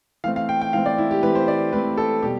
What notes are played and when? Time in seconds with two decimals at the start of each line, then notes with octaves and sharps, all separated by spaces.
0.24 E3 A3 C4 F5
0.36 F5
0.49 G5
0.62 G5
0.73 E3 A3 C4 F5
0.86 D5
0.98 E4
1.11 G4
1.23 E3 A3 C4 B4
1.35 C5
1.48 D5
1.73 E3 A3 C4 B4
1.97 A4
2.23 B2 G3 G4